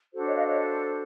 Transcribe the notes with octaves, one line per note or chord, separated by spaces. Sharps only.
D4 F#4 A4 C5
C#5 D#5
D#5 F5
C#5 D#5